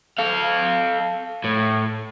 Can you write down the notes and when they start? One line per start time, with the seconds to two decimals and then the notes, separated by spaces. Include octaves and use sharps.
0.19 A4 F5
1.44 A2